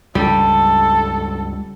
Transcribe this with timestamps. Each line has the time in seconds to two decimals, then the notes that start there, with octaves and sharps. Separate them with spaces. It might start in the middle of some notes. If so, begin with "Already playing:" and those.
0.15 C#2 G2 G3 A4